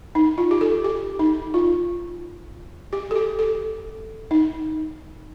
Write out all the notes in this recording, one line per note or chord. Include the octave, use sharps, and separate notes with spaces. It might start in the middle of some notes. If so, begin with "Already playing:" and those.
D#4
F4
G4
A4
G4
D#4
F4
G4
A4
G4
A4
D#4